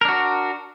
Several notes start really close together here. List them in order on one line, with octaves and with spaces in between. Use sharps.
A#4 D4 F#4